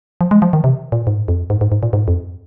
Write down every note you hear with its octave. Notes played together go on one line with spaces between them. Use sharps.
F3
G#3
F3
D#3
C3
A#2
G#2
F2
G#2
G#2
G#2
A#2
G#2
F2